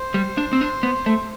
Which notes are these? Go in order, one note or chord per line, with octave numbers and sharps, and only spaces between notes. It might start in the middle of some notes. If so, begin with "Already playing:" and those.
Already playing: C5
G3
D4
C4
D4
B3
A3